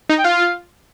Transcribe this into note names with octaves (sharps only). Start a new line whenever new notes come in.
D#4
G5
F4 F5